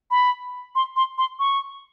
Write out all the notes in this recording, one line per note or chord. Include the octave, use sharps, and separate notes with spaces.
B5
C6
C6
C6
C#6